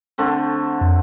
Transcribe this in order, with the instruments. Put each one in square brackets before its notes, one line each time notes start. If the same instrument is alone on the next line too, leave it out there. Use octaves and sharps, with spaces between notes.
[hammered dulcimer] D3 A3 C4
[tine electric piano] F2